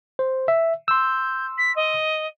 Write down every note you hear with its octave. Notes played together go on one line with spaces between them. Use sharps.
C5
E5
C6 E6 G6
B6
D#5